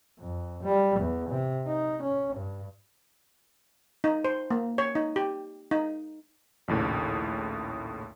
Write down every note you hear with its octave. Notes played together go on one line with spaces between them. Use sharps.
F2
G3
E2
C3
D#4
C#4
G2
D#4
C5
A#3
C#5
D#4
G4
D#4
A#1 D#2 A2 C#3